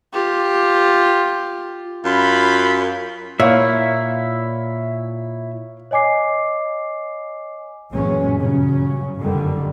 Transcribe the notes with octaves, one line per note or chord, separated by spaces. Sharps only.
F4 G4
F#2 F4 B5
A#2 E4 C#5 E5 F5
C#5 D#5 G#5 D6 C7
F#2 A#2 E3 F#3 G#3 C#4
G2 C#3 F#3 C#4
F#1 F2 D3 D#3 G3